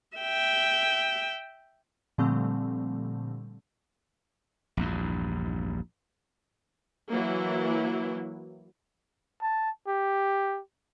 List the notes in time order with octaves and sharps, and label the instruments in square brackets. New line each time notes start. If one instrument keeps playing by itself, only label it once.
[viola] E5 G5
[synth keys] A#2 D3 F3 G3 A3 C4
[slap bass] A#1 E2 G2
[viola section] E3 F#3 A#3 E4
[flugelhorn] A5
G4